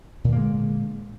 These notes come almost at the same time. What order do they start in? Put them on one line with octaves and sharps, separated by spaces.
A#2 D3 A#3 G#3